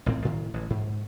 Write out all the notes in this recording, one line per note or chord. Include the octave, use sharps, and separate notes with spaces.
A1 A2 C4
A2 D#3
A1
G#2